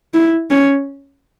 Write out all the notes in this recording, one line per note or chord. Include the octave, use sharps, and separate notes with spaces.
E4
C#4